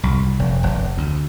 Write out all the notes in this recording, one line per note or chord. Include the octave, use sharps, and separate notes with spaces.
C2
F1
F1
D2